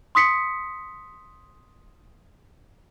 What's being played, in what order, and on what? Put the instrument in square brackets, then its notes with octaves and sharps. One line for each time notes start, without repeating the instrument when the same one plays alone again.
[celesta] C6 D#6 B6 C#7